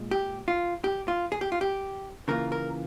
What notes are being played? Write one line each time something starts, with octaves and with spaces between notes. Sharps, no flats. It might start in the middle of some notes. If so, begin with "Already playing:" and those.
Already playing: A#2 G#3
G4
F4
G4
F4
G#4
G4
F4
G4
C#3 E3 A#3 F4 A#4
A#4